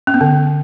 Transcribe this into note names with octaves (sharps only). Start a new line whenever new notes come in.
C#4
B3
D3